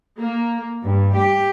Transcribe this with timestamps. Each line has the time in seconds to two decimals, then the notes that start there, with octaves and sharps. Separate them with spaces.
0.18 A#3
0.83 G2
1.15 G4